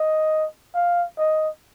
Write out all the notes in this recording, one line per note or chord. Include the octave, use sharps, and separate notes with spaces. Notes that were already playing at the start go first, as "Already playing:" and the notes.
Already playing: D#5
F5
D#5